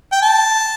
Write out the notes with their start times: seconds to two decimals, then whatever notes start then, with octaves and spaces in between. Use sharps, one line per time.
0.12 G5
0.22 A5